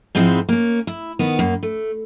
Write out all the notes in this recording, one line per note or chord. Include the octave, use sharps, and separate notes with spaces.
G#2 F3 G#3 C4 D#4 E4
A#3 C#4
E4
D#3 B3
F#2 A#3
A3